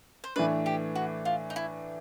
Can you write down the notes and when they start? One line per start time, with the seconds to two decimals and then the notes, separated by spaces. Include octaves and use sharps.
0.24 C5
0.36 A2 E3 A3 D4 B4
0.66 G4
0.95 F#4
1.25 F4
1.50 D#4
1.56 E4